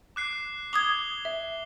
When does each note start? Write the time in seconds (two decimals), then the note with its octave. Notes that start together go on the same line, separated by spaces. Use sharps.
0.16 D6 F#6 C7
0.73 D6 D#6 G#6 F7 G7
1.25 E5